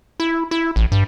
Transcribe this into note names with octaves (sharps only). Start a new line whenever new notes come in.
E4
E4
A1
G2